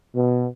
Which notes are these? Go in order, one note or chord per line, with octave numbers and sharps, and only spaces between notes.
B2